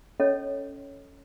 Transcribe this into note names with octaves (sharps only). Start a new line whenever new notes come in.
C#4 A4 C#5 D#5